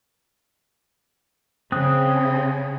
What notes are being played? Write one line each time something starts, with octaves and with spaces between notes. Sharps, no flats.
C#3 C4 D#6 F#6